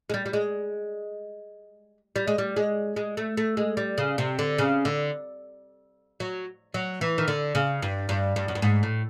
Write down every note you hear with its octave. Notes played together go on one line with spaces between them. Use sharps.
G#3
G3
G3
G#3
G3
G#3
G3
G#3
G#3
A3
A3
G#3
G3
C#3
C3
D3
C#3
D3
F#3
F#3
E3
D#3
D3
C#3
G2
G2
G2
F#2
G2
G#2
A2